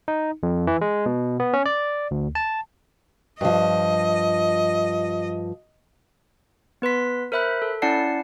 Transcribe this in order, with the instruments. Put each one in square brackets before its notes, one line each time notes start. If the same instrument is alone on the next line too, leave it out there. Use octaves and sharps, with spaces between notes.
[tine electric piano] D#4
F2
E3
G#3
B2
B3
C#4
D5
D2
A5
[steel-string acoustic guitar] G2 F3 [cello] D#5
[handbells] B3 B4 C6 B6
A#4 C5 E5 B5 F#6
A4
C#4 E4 D5 F#5 A5 C7